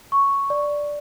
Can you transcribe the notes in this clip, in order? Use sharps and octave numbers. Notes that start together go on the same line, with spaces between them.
C#6
D5